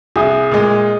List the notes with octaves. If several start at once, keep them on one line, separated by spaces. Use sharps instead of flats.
C2 G#4
A#2 G#3